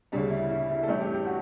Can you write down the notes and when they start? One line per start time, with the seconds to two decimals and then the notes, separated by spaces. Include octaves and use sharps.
0.12 D2 C#3 G3 C#4 D4
0.31 E4
0.50 E4
0.70 E4
0.83 A4
0.88 G2 E3 A3 C#4 G4
1.00 G4
1.13 G4
1.26 F#4